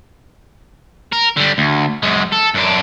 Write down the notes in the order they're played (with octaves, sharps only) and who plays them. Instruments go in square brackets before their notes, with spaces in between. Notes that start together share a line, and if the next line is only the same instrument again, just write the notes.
[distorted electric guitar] A#4
D3 G3
D2
F#2 G#3
A4
F#2 D4